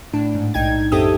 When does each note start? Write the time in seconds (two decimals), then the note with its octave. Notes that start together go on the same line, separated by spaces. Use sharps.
0.13 A2 D4
0.35 G#2
0.54 B1 D#4 G5 G#6
0.92 F#2 C4 G4 A4 E5 D#6